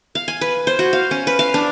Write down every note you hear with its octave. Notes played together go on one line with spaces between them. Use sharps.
F5
G#5
B4
C5
F#4
F5
C#4
B4
F5
D4